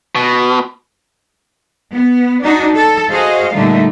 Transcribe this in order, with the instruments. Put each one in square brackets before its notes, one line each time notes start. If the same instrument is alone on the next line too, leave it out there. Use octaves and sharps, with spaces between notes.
[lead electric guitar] B2
[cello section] B3
D4 D#4 F#4
A4
F#4 G#4 C5 D#5 F5
A#2 D3 G3 A3 D#4